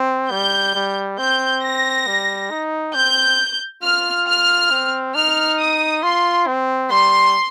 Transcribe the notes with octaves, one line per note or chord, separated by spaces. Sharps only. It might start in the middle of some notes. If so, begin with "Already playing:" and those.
Already playing: C4
G3 G6
G3
C4 G6
A#6
G3
D#4
C4 G6
F4 F6
F6
C4
D#4 F6
D#6
F4 C6
C4
G3 C6